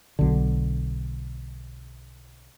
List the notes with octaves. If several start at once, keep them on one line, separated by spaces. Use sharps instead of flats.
B1 D3